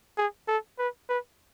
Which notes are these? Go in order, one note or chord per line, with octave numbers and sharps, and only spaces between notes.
G#4
A4
B4
B4